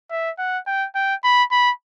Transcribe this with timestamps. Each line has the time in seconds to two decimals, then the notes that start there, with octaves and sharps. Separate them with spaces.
0.11 E5
0.38 F#5
0.67 G5
0.95 G5
1.24 B5
1.51 B5